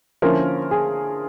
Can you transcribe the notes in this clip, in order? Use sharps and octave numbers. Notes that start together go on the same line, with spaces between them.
D3 F3 A#3 C#4 E4 A#4
G#4